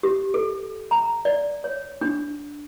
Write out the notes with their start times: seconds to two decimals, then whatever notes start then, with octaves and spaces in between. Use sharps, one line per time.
0.03 G4
0.34 A4
0.91 A#5
1.25 D5
1.64 C#5
2.01 D4